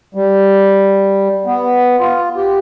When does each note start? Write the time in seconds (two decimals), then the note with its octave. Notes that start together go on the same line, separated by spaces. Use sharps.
0.15 G3
1.46 B3
2.00 F4
2.36 G4